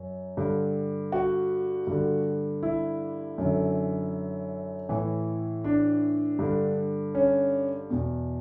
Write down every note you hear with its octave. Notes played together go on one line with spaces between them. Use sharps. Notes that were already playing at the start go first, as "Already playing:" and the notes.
Already playing: F#2
G2 D3
F#4
G2 D3
E4
F#2 D3
A2 E3
D4
G2 D3
C#4
E2 B2